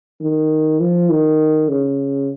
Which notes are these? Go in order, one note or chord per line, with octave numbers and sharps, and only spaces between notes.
D#3
F3
D#3
C#3